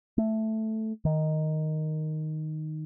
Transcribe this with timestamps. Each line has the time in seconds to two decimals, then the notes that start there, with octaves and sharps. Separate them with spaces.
0.18 A3
1.05 D#3